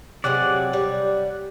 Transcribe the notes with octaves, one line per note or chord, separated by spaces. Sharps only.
C3 F#3 G#3 D5 F#5
G3